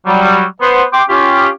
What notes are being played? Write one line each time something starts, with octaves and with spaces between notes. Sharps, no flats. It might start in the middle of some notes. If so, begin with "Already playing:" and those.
F#3 G3
B3 C5
G5 C6 D6
C#4 F4 G4